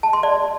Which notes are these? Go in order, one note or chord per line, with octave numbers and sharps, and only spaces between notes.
A5
C6
D5